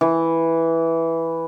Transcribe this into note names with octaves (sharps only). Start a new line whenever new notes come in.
E3